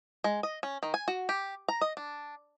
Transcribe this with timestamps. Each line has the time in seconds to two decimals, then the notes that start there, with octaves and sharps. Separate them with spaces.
0.24 G#3
0.43 D#5
0.63 C#4
0.83 D#3
0.94 G#5
1.08 F#4
1.29 G4
1.68 A#5
1.81 D#5
1.97 D4